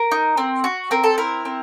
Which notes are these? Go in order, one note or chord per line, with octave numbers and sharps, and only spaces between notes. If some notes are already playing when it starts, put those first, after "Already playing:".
Already playing: A#4
D#4
C4
F#4
C4 A#4
A4
E4 A#4
C4